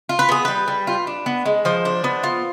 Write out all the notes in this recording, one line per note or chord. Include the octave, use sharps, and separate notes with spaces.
F4
B4
B3 G#4
G3 B4
G3
F4
D4
B3
G#3
F3 C5
D4
B3
F4